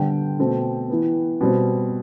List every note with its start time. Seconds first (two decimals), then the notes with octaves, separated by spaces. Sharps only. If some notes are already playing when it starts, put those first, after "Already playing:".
Already playing: D3 G3 B3 G5
0.39 B2 A3 C4
0.90 E3 B3
1.41 B2 G3 C4